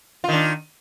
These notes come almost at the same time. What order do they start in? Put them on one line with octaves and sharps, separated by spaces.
F4 D#3 D4